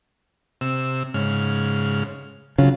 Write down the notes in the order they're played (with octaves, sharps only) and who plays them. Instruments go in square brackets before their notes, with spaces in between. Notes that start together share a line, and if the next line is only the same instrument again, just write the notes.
[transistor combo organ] C3 E6
G#2 C#3 F6
[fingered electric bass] C#3 [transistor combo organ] F#3 F4